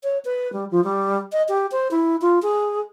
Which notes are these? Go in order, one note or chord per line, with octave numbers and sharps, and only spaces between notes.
C#5
B4
G3
F3
G3
D#5
G4
C5
E4
F4
G#4